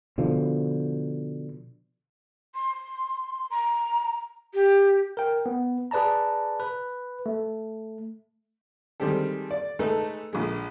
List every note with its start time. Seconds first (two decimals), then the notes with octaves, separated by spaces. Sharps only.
0.18 B2 D3 F3
2.55 C6
3.51 A#5
4.54 G4
5.17 A#4 G5
5.46 B3
5.91 G#4 B4 D5 A5 A#5
6.60 B4
7.26 A3
9.00 D#3 G3 G#3 C4 G4 A4
9.51 D5
9.79 G#3 A3 D#4 A4 B4
10.33 A#1 G#3